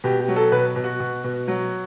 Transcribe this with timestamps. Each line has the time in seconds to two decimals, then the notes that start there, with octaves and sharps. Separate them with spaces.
0.04 B2 G4
0.20 G4
0.28 F#3
0.36 A4
0.52 B2 B4
0.76 B2
0.84 F#4
1.00 B2
1.24 B2
1.48 F#3